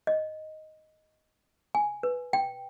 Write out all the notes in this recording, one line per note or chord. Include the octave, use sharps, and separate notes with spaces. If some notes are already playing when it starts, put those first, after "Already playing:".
D#5
G#5
B4
G5